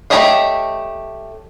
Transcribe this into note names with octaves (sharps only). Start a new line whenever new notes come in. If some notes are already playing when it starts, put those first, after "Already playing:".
A3 G4 C#5 D#5 F5